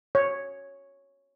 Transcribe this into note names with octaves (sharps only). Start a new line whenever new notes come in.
C#5